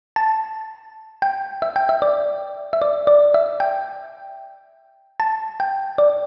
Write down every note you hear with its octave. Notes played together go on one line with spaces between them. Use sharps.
A5
G5
E5
G5
E5
D5
E5
D5
D5
E5
G5
A5
G5
D5